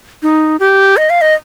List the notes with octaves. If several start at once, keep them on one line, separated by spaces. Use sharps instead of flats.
D#4
G4
D#5
F5
D#5